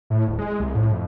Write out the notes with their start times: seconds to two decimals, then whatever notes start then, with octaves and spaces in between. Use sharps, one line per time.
0.10 A2
0.28 D1
0.39 G#3
0.60 C2
0.75 A2
0.92 F2